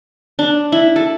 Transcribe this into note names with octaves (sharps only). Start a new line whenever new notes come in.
D4
E4
A4